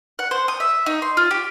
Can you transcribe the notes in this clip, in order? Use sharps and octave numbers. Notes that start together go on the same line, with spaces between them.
F#5
C5
D#6
E5
D#4
C6
F4
G4